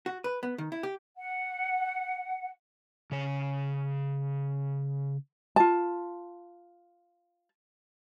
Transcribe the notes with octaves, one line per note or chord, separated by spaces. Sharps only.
F#4
B4
B3
D#3
E4
G4
F#5
C#3 C#5
F4 A5